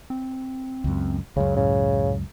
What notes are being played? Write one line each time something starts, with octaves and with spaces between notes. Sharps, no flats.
C4
C#2 F#2
C#2 F#2 C#3
A2 C#3